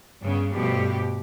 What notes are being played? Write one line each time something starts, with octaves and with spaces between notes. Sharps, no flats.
G2 C#3 B3
G2 B2 F3 A3 G4